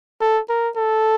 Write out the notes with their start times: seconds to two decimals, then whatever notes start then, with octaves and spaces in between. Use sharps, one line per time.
0.21 A4
0.49 A#4
0.76 A4